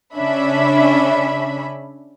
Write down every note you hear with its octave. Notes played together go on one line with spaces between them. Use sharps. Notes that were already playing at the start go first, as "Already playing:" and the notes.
C#3 C#4 D4 E5 B5